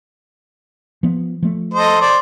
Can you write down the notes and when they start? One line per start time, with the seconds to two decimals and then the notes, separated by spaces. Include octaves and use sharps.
1.03 F3 B3
1.42 F3 A3
1.74 A4 C5 D#5
2.01 C5 D5